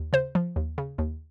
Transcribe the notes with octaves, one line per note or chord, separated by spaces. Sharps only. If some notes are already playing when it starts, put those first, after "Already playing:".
Already playing: D#2
C#3 C5
F3
D#2
C#3
D#2